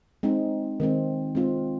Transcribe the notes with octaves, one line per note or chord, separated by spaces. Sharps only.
G#3 C4 D#4
D#3 G#3 C4
G#3 C4 F4